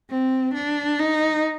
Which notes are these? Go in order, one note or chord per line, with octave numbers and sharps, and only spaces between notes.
C4
D4
D#4